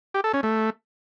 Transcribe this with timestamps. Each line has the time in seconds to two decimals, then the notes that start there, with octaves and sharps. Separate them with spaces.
0.14 G4
0.24 A4
0.34 C#4
0.43 A3